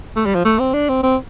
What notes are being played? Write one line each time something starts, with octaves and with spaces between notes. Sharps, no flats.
A3
G3
F3
A3
C4
D4
C4
C4